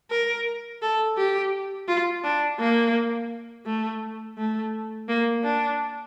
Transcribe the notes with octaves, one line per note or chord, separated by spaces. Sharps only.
A#4
A4
G4
F4
D4
A#3
A3
A3
A#3
D4